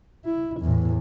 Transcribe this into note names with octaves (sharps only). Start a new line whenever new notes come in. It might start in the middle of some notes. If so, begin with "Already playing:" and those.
E4
E2 A2